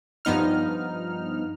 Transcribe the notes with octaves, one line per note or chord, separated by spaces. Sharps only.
G2 F3 B3 D#4 F6